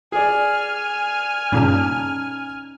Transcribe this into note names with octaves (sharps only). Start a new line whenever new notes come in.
G#4 D5 G#5 F6
G2 A#2 C#3 C#4 D#4 A5